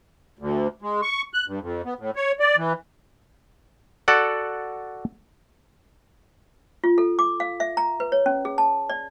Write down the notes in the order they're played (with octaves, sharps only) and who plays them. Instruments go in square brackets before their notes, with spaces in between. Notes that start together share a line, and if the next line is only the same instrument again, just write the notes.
[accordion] D2
G#3
C#6
F#6
G2
F2
B3
A2
C#5
D5
E3
[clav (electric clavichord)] F#4 A4 D5 F#5
[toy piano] F4
A4
D6
F5
E5
A#5
B4
C#5
C#4
G#4
A5
D5